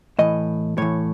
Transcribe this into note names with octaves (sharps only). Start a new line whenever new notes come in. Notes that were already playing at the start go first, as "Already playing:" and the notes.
A2 E3 D#5
A2 E3 C#5